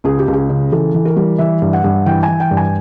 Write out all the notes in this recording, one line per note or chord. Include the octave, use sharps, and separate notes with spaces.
C#2 G#4
G4
C#2
G#4
C#3
E3 A4
E3
A#4
G3
E3 E5
G2
F#5
G2
E3 G5
G#5
E3
G5
G2
G#5